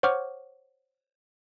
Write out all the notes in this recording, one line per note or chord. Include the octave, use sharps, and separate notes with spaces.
C5 C#5 F#5 C#6 D6 F6